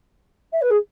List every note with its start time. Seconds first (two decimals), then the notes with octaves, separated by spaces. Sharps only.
0.52 E5
0.61 B4
0.70 G#4